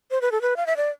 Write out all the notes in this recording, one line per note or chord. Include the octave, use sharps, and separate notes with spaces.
C5
B4
A4
B4
F5
E5
D5